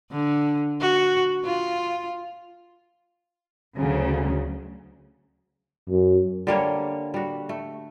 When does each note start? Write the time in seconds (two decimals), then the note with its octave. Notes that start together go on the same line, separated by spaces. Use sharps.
0.12 D3
0.81 F#4
1.45 F4
3.78 D2 C#3 F#3
5.89 F#2
6.47 D3 G3 A#3 C#5
7.14 G3 F#4
7.49 A3